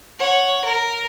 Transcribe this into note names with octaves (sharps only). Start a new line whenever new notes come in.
C#5 F#5
A#4